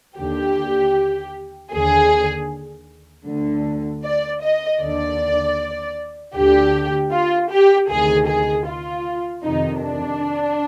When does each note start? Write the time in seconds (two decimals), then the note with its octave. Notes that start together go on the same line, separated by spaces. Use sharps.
0.17 D#2 D3 G4
1.71 D#2 D3 G#4
3.26 D2 D3
4.04 D5
4.42 D#5
4.80 D#2 D3 D5
6.35 D2 D3 G4
7.12 F4
7.51 G4
7.89 D2 C3 D#3 G#4
8.28 G#4
8.67 F4
9.43 F2 C3 D#3 D#4
9.82 D4